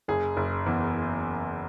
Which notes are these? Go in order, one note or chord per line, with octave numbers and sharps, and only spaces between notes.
F#1 G#4
F#1
E2